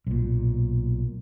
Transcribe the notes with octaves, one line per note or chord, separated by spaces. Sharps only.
B1 A#2